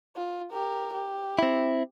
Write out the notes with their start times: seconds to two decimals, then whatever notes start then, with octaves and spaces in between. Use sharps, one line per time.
0.16 F4
0.51 G4 A#4
0.94 G4
1.39 C4 E4